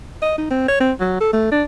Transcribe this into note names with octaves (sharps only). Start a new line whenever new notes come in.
D#5
D#4
C4
C#5
C4
F#3
A4
A3
D4